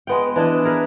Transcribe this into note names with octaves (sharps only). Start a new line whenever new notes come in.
G#3 B3 G5
E3 D4 E4 D#5
G#4 A#4 B4